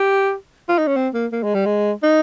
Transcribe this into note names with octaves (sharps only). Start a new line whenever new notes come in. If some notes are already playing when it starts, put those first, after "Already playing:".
Already playing: G4
F4
D#4
C#4
C4
A#3
A#3
G#3
G3
G#3
D#4